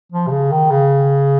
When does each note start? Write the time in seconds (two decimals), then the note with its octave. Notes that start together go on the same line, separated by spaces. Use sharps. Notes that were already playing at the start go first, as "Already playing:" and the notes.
0.12 F3
0.27 C3
0.31 C#3
0.52 D#3
0.71 C#3